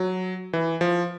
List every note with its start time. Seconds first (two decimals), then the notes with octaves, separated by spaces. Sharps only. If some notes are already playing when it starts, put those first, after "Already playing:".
Already playing: F#3
0.53 E3
0.81 F3